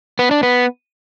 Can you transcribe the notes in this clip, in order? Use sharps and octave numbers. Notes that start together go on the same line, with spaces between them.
B3
D4
B3